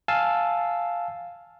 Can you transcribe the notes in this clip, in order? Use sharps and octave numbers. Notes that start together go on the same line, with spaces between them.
F5 G#5 A5 E6